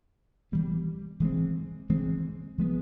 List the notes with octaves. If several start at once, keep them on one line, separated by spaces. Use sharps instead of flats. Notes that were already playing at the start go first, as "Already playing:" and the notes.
E3 G3 B3
E3 G#3 C4
E3 G#3 C4
F3 G#3 B3